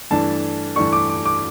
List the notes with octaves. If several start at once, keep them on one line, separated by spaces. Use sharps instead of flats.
G2 E3 A3 D4 A5
G2 E3 A3 D4 C#6
D6
D6
D6